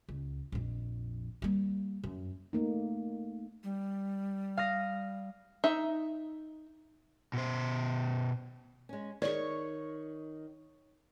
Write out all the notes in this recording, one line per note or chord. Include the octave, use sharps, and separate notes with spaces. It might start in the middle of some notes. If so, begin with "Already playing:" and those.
C#2
A#1 F2
G3 A#3
F#2
A3 A#3 D#4
G3
F5 D#6 A#6
D#4 E5
B2 C5
G#3 C#4
D#3 G#4 C#5 D5 C#6